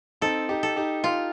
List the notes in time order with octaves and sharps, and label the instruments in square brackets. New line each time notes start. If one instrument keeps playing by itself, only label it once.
[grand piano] C4 D#4 [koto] A4
[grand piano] D#4 G4
[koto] A4
[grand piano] D#4 G4
[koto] F4